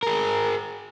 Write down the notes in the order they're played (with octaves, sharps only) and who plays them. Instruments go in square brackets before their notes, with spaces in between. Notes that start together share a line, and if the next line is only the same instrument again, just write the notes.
[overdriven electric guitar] G#4 A#4